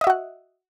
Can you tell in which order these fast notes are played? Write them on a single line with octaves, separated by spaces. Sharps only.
D#5 E5 F#4 F#5